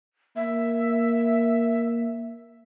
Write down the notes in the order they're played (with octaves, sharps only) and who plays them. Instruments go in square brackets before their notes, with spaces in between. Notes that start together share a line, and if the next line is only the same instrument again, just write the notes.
[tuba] A#3 [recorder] E5